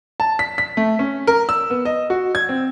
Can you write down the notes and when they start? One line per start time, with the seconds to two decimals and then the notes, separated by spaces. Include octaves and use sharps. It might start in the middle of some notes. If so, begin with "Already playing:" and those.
0.20 A5
0.39 B6
0.58 B6
0.77 A3
0.99 C#4
1.27 A#4
1.49 E6
1.70 B3
1.85 D#5
2.10 F#4
2.35 G#6
2.49 C4